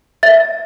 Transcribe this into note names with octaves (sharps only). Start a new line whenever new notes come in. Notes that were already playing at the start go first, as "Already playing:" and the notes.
E5 A6